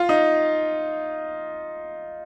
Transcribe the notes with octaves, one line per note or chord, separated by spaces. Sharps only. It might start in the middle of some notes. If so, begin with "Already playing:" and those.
Already playing: F4
D#4